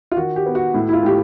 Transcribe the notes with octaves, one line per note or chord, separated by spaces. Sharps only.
F4
D#3 F#4
G4
B3
F#4
A2 E4
E4
F4
A2 G4